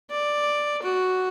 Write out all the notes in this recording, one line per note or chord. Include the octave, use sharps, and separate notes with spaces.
D5
F#4